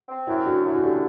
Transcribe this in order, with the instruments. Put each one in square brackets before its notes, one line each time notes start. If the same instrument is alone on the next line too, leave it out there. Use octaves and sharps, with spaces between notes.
[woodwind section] C4
[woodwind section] F#2 [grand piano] E4
[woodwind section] D3 [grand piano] F#4
[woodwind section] F#2 [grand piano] E4
[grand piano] F#4
[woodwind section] D3 [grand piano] G4